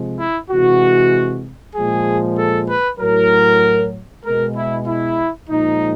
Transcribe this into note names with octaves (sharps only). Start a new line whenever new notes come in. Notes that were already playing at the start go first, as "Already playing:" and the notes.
Already playing: C3 F3 G#3
E4
C3 E3 G#3 F#4
A#2 F3 G#3 G#4
A4
B4
A2 F#3 A#4
B2 G#3 A#4
E4
E4
A#2 F3 G#3 D#4